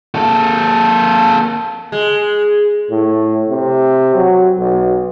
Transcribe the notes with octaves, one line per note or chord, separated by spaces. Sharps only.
A#3 A4
G#3
A2
C3
F#3
B1